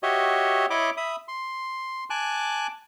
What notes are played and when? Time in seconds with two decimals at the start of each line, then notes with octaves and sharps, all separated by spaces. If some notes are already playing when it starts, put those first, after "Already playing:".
0.03 F#4 G4 C#5 D#5 E5
0.70 E4 C#5 D#5 B5 D6
0.97 E5 B5 D#6
1.28 C6
2.10 G#5 A5 D6 F#6